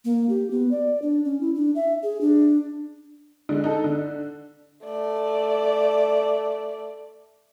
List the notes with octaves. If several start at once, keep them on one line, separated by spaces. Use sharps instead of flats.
A#3
G4
B3
D5
D4
C#4
E4
D4
E5
G#4
D4
D3 G#3
D#4 A4
D3
A3 D5